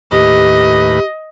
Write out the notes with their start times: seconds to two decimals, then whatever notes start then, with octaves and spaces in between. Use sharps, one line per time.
0.12 D#2 A2 G4 B4 D#5